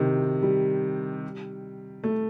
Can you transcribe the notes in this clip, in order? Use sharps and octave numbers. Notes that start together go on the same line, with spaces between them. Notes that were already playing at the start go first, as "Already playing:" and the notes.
Already playing: C3 D#3
G3
A3